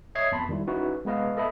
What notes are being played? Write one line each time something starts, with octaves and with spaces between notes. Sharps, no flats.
C#5 D#5 E5 D#6 G#6 C7
F2 B3 A5 B5 C6
D#3 G3 E4
C#4 D#4 E4 F#4 B4
G#3 B3 B4 D#5 F5
A4 D#5 E5 B5